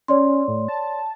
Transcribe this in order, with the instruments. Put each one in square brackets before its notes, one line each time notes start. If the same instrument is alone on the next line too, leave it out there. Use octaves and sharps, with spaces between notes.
[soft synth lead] C#4 [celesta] C#5 D5 C6
[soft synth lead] A2
A5